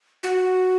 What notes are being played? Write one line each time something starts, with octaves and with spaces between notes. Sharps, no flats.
F#4